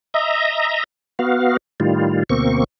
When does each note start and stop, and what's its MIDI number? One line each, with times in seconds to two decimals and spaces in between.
0.14 0.84 75
0.14 0.84 76
0.14 0.84 82
1.19 1.57 59
1.19 1.57 66
1.19 1.57 77
1.80 2.23 45
1.80 2.23 51
1.80 2.23 55
1.80 2.23 65
2.30 2.64 38
2.30 2.64 47
2.30 2.64 58
2.30 2.64 60
2.30 2.64 85